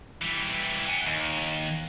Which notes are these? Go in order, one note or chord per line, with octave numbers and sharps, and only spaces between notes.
E3 G3
F#5 G#5
D#2